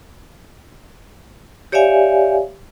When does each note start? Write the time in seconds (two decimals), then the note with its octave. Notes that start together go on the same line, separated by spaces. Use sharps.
1.72 G4 C#5 D5 E5 F5 G#5